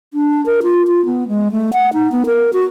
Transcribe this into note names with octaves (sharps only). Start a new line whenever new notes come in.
D4
A#4
F4
F4
B3
G#3
A3
F#5
D#4
B3
A#4
F#4